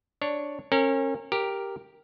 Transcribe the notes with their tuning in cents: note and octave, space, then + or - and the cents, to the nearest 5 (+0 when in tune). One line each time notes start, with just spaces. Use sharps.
D4 +0 C#5 +0
C#4 -35 A#4 -30
G4 +0 A#4 +0